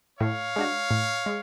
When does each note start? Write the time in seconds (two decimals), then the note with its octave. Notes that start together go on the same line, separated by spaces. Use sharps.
0.20 A2 C#5 F5
0.56 G#3 D4 F#4
0.91 A2
1.26 G#3